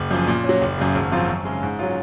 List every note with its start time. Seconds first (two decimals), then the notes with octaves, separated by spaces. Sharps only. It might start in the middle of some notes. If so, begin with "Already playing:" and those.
Already playing: F#1
0.11 F#2 F3
0.27 A#2
0.44 F#3 C#4
0.61 F#1
0.78 F#2 C#3
0.95 G#1
1.12 F#2 F3 C4 F4
1.29 F#2
1.45 C#3 G#3
1.63 G#2
1.79 F#3 C#4 F4